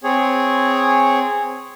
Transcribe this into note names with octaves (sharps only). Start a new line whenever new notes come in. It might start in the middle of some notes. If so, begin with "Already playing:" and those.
C4 G#4 C#5